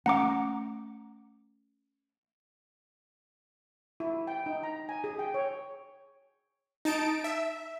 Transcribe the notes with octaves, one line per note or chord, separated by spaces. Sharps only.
A3 C#4 F#5 A#5 D6
E4
G5
D#4
A#5
G#5
G#4
G5
C#5
D#4 A5 D7
E5